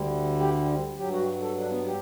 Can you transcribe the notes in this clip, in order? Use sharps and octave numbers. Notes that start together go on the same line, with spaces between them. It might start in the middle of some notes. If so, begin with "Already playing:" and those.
Already playing: D2 D3 G3
G4
G2 F#3 G4
F#4
A4
D4
B3
G4